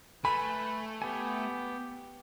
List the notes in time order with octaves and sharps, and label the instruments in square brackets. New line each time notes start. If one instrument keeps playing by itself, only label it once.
[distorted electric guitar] A3 [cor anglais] B4 [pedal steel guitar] G#5 [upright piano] B5
[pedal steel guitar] B3 G#5 [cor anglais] G4